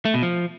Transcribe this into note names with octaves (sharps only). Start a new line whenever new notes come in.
A3
B2
F3